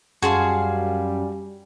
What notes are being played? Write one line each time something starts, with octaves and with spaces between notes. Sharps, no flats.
F#2 G3 F#4 G#4 F5 A5 C6